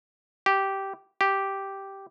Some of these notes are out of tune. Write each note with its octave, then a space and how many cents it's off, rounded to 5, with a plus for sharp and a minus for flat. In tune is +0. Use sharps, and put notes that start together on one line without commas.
G4 -10
G4 -5